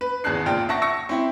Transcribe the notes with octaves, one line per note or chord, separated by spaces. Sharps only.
B4
G#1 E2 G#4 A5 F#6 C7
A#1 F4 G5
E5 F#5 A5 C#6 A#6
C#6 E6 A#6 C#7
C4 E4 E5